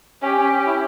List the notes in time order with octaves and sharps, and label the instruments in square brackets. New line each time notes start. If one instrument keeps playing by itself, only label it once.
[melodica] C#4 [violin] G4
[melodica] C#4
C#4
E4